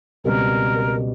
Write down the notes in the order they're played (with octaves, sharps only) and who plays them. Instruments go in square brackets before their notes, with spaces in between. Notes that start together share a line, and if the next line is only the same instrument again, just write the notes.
[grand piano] C#2 B2 G3 C4 [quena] A#4